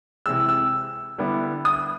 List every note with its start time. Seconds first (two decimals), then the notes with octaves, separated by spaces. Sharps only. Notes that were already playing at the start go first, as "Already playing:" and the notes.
0.26 C3 E3 G#3 E6
0.49 E6
1.18 D3 G3 B3 E4
1.65 D#6